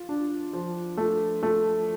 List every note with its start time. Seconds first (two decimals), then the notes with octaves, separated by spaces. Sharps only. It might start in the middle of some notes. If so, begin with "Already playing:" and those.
Already playing: F4
0.09 D4
0.53 F3
0.97 A3
1.43 A3